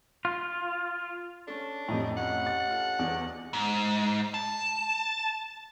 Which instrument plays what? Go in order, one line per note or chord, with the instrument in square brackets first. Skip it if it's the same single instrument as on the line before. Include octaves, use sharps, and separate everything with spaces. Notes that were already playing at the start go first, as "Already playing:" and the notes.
[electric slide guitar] F4
[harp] C#4 A4 [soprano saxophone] D4
[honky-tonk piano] F2 A2 [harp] G4 D#5 A#5
[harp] C#4 [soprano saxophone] F#5
[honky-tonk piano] A6
[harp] F4 A4
[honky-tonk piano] E2 [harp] D5
[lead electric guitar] G#2
A5